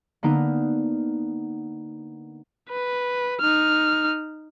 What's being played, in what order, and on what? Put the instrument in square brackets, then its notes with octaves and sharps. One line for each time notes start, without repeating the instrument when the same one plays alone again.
[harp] D3 A#3 B3 D#4 A#4
[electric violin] B4
D#4 F6